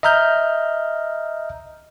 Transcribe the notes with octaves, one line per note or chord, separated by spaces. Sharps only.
D#5 E5 A#5 F6 G6